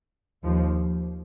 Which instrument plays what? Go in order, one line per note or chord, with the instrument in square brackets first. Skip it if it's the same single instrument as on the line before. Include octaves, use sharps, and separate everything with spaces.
[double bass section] D#2 F3